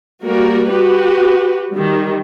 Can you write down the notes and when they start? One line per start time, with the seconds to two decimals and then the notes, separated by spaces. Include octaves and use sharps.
0.23 G3 A#3 F#4 A#4
0.68 F#4 G4 B4
1.70 D#3 G3